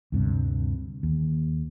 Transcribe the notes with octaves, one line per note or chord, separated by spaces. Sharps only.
D2 G2 C3
D#2